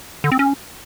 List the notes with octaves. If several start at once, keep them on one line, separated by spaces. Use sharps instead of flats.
D3
C4
C#4